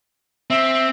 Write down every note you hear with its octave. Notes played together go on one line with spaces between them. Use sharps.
C4 E5